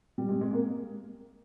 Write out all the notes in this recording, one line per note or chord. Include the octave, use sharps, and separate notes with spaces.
G3
G#3
G#3
A#3